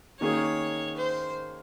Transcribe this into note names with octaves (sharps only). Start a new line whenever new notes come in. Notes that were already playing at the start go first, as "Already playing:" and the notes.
D#3 A#3 C#4 G#4 C#5
C5